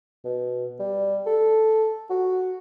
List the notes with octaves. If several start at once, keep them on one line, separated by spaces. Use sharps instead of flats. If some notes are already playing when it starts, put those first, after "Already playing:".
B2
G3
A4
F#4